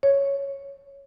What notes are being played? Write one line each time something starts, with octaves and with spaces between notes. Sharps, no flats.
C#5